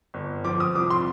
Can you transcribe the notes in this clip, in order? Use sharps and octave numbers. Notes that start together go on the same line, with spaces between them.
G1
F3 D6
D#6
C2 D6
C6